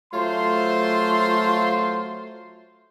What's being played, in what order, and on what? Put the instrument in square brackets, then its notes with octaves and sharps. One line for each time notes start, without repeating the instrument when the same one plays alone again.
[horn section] F#3 A3 F4 C5 C6